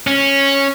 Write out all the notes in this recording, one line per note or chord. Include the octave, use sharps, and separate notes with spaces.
C#4